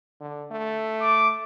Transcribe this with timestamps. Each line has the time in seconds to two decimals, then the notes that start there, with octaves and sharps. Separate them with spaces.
0.21 D3
0.52 A3
1.01 D6